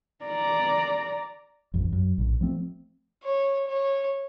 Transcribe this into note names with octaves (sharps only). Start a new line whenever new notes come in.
D5 A#5
A1 F2
F#2
A#1 A2
F3 A3 C4
C#5
C#5